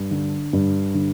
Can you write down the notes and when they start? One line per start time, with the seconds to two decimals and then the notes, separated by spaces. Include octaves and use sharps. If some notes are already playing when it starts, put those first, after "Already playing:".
Already playing: G2
0.11 D3
0.53 G2
0.94 D3